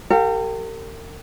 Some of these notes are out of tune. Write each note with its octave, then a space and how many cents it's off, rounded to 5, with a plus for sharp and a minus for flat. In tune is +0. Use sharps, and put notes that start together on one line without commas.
G4 +0 A#4 -40 F5 +40